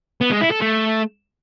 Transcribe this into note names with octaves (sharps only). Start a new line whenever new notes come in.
B3
G#3
E4
A4
A3